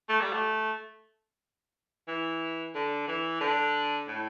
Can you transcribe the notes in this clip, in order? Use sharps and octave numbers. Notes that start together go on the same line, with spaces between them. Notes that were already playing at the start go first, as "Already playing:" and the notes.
A3
G3
A3
E3
D3
E3
D3
A2